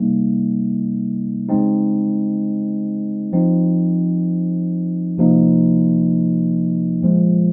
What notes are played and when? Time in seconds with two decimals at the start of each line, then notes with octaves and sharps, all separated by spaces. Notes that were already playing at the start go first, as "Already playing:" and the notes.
Already playing: C3 G3 A#3 D#4
1.49 C#3 G#3 C4 D#4
3.33 F3 C4 D#4
5.18 C3 F3 A#3 D#4
7.03 A#2 F3 G#3